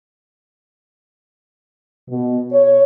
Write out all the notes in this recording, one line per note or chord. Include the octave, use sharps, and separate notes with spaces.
B2
C#5